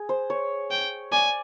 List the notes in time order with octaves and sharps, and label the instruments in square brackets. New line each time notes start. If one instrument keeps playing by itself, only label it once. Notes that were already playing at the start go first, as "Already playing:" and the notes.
Already playing: [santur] G#4
C5
C#5
[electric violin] G5
[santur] D5 [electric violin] G#5